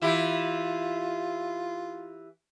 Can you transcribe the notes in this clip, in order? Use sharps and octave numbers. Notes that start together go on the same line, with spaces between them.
E3 E4 F4 G4